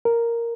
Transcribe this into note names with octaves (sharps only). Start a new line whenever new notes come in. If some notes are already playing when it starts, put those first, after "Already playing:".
A#4